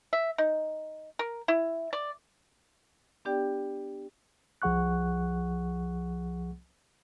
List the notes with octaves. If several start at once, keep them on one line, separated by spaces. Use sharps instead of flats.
E5
D#4
A#4
E4
D5
B3 D4 G4 D5 G5
C2 F3 G#4 F#5 C#6 F#6